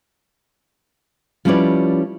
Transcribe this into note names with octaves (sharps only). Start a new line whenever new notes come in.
F3 G3 C#4 E4 B4 D5